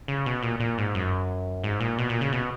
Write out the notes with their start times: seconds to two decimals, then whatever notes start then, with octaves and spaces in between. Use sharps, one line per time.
0.08 C#3
0.26 B2
0.43 A#2
0.60 A#2
0.78 G#2
0.95 F#2
1.64 G#2
1.80 A#2
1.98 B2
2.09 A#2
2.21 C#3
2.32 B2